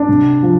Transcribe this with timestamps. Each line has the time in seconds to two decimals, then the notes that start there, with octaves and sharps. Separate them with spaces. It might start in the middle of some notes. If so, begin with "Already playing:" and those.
Already playing: D4
0.09 C3
0.43 F3